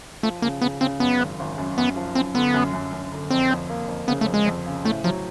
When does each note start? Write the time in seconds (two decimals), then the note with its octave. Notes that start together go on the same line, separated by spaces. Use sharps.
0.23 F3 A3
0.42 C#3 A#3
0.61 C#3 B3
0.81 C#3 C4
1.00 F#2 B3
1.19 G#1
1.39 G#1
1.58 F#2
1.77 F#2 B3
1.96 F3
2.15 F#2 C4
2.34 D3 B3
2.54 F#2
2.73 F#2
2.92 F#2
3.12 D3
3.31 F2 C4
3.51 F2
3.70 A#3
3.88 F2
4.08 C#3 B3
4.21 A3
4.27 F2
4.34 G#3
4.46 F2
4.66 C#3
4.84 A2 A3
5.04 F3 F#3